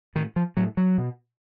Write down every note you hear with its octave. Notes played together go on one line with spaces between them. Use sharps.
A2 D#3
F3
A2 F#3
F#3
B2